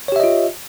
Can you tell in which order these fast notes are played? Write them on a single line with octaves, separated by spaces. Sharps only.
C#5 G4 E5 D#5 F4